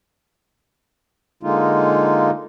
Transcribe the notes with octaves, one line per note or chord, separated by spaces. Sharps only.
D3 G#3 A#3 D#4 F4